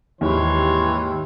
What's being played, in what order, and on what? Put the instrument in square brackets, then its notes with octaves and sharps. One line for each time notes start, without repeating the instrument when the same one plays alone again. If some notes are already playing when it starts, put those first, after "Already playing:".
[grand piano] D#2 G#2 [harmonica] E3 C#5 C6